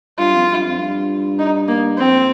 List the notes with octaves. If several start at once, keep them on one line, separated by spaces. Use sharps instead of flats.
G2 F4
F2
G#2
G2
F2
G2
D#4
A#3
F2 C4